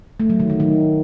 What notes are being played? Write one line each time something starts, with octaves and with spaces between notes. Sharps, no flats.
A3
F#3
D#3
D#3
D#3